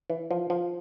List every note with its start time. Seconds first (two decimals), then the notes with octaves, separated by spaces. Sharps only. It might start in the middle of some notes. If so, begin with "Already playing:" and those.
0.10 E3
0.31 F3
0.50 F3